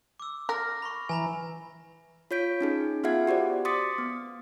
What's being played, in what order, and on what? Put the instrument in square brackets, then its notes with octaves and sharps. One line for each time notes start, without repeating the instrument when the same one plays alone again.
[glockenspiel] D6 E6
[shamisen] A#4 [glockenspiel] D6 F6 A#6
[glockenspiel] B5 C#6
[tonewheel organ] E3 [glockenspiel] G#5 A#5 B5
[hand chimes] F4 C#5 G6 B6 D7
C#4 D#4 G#4
B3 F4 G#4 E5 F#5 G#6
F#4 G4 C5 D5
C6 D6 D#6 A6 B6 C#7
B3